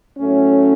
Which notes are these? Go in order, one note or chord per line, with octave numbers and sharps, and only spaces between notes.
A2 F#3 A3 C#4